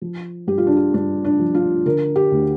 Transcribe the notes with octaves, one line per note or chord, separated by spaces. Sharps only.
F3
G2 G4
F4
D4
F4
G2 D4
D4
F3
F4
D3 A#4
G4
D2